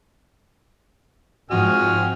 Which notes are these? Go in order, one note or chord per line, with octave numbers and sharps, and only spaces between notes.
G#2 F3 C4 F#4 D#5 G#5 F6